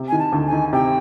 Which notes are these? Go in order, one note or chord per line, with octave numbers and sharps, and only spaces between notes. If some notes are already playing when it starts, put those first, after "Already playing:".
Already playing: C3
D#3 G#5
A5
D2
G#5
D#3
C3 G5